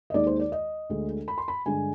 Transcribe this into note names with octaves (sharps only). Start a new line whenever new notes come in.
D#5
D#2 D#3 G#3 D5
C5
D5
D#5
D2 D3 G#3
B5
C6
B5
G2 D3 G#3 G#5